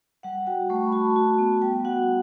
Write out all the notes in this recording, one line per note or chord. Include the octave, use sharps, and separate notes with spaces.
G3 F#5
F#4 G5
A3 C#6
B5
F#4 A5
F#4
B3
G3 G5
F#4 F#5